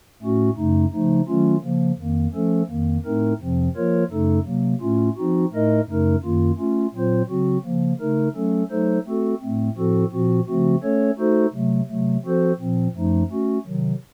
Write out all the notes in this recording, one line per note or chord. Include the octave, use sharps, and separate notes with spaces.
A2 A3 C#4 F#4
F#2 C#3 A3 D#4
C#3 F3 A3 D#4
D#3 F#3 A3 C#4 F4
C#3 F3 A#3
F2 D#3 A#3
F3 A3 C#4 A4
F2 D#3 A#3
A2 A3 C4 D#4 A#4
F2 C3 F3 C4
F3 A#3 F4 A#4 C#5
F#2 C#3 A3 D#4 A4
C3 F#3 A#3
A2 A3 C#4 F4
F3 C4 D#4 F#4
A2 A3 D#4 A#4 D#5
F#2 C#3 A3 D#4 A#4
F#2 D#3 A#3 F4
A3 C#4 F4
A#2 F#3 C4 F4 C5
C#3 F#3 C4 F#4
C#3 F3 A#3
C#3 A3 D#4 A#4
F#3 A3 C#4 A4
F#3 A3 D#4 A4 C5
A3 C4 F#4 A4
A2 A3 C4
A2 F3 C4 F#4 A4
A#2 F3 C4 F#4
C#3 F3 A3 C4 F#4
A3 C#4 A4 C#5
A3 D#4 F#4 A4 C5
C3 F#3 A3
C3 F#3 A3
F3 C4 F#4 A4 C5
A#2 F3 C4
F#2 F3 A3 D#4
A3 C#4 F#4
C3 D#3 F#3